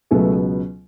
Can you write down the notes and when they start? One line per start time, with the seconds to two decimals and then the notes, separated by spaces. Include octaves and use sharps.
0.11 C#2 B2 F#3 A3 B3 A4